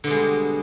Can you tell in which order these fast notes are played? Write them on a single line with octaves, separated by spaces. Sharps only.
D3 B2 G#3 G3